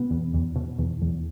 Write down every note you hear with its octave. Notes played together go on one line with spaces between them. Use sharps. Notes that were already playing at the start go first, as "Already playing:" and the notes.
Already playing: B2 B3
E2
E2
B2
E2
E2